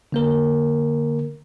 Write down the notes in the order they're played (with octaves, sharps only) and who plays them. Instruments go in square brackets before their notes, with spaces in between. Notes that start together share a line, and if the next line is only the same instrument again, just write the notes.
[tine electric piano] D3 A#3 A#4